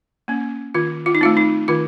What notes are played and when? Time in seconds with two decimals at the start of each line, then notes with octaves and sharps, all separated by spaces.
0.28 A#3 C#4
0.74 D#3 F4
1.06 F4
1.15 D#4
1.21 A3 C4 F4
1.37 D#4
1.68 D#3 F4